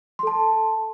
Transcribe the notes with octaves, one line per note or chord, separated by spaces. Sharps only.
A4 A5 C6